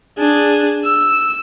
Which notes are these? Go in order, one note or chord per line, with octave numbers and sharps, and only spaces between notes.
D4 G#4
E6